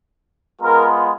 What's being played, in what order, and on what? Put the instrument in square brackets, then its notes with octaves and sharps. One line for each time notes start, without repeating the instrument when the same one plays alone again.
[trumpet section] G#3 B3 F4 A#4